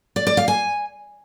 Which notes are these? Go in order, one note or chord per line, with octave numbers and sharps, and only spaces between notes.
D5
D5
F5
G#5